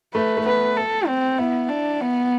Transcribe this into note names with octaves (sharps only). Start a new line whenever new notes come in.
A3 B4
A3
B3 B4
A4
C4
B3 E4
D4
B3